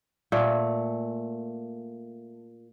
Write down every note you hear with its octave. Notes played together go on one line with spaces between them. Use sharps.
A#2 A3